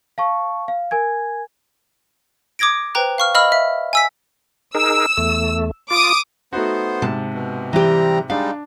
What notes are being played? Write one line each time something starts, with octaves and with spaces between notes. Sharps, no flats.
F5 A5 C#6
F5
A#4 G#5 G#6
D6 D#6 G#6 A#6 D7
B4 C5 G5 A#5 F#6
F5 C#6 F6
D#5 F5 B5 E6 F6
E5
G#5 E6 B6
D#4 G#4 A#4 E6
E2 A3
F4 D6 D#6
A3 B3 D#4 F#4 C5
G#2 C3 A5
B2
E3 G3 C4 G4 A#5
G3 G#3 D4 D#4 F5